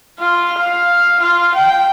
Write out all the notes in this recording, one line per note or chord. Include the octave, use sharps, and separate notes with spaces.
F4
F5
F4
G5